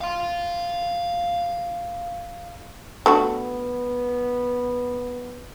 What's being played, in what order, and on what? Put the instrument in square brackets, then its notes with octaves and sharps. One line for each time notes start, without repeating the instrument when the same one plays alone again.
[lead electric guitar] F5 C6
[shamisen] A3 D4 F#4 [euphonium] B3